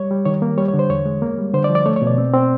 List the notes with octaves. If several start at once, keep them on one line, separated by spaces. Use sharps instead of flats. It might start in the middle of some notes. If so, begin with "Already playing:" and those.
Already playing: G3 C#5
G3
D#3 C#5
A#3
G3 C#5
C#5
D3
C5
E2 C#5
G#3
A#3
G3
D3 C5
D5
F3
D5
A3 C#5
C#5
B2
D5
C4
C4